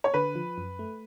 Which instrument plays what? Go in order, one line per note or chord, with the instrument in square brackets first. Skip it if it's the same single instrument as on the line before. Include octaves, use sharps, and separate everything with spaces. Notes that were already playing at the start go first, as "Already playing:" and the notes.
[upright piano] C#5
[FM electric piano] D3 [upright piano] B4
[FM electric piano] F3
F#2
A3